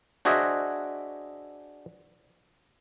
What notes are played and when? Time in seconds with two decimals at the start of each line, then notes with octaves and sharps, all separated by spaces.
0.25 D4 F#4 G#4 C5 D#5 E5